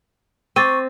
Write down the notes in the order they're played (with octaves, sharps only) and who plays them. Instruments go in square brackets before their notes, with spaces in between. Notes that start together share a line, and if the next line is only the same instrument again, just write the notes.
[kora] C4 [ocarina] C#6 [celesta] D6 A6 D#7